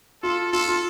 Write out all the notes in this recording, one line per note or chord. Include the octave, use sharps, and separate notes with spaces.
F4 A4
F4 A4
F4